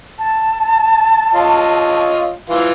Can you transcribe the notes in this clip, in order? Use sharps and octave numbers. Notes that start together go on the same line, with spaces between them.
A5
F4 C#5 D#5
E3 F4